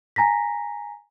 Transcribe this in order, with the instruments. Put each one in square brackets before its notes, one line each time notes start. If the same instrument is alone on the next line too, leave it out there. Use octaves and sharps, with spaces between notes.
[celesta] G#5 A#5 A#6 B6